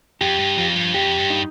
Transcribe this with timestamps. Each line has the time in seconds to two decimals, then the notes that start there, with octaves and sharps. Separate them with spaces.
0.21 F2 G4
0.39 G2
0.58 F2 F3
0.76 G2
0.94 F2 G4
1.18 G2
1.30 D#4